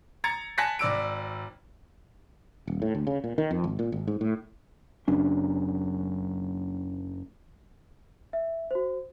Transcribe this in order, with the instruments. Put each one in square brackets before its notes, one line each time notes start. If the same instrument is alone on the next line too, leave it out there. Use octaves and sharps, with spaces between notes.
[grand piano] A#5 G#6 A6 C#7
G#5 A5 F#6 A#6 B6 C#7
G#1 D5 E6 D7
[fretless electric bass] D#1
A2
D2
C#3
A#2
D#3
F2
G#1
A#2
G#1
G#2
A2
[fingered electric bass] F#1 F#2 D4
[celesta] E5
F#4 C5